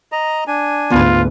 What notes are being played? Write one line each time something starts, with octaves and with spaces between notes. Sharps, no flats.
D#5 A#5
D4 G#5
D2 G#2 B3 F4 B4